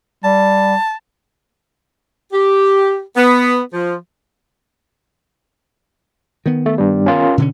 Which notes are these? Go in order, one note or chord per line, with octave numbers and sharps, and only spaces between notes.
G3 A5
G4
B3
F3
D#3 B3
A3
G2 G3
C#4 F4 A#4
B2 D3 C#4